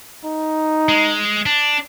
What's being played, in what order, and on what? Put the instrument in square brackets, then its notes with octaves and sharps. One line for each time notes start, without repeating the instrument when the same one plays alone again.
[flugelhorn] D#4
[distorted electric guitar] G#3
D4